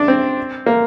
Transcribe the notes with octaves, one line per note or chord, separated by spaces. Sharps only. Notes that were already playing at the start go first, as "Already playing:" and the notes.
Already playing: D4
C4
A#3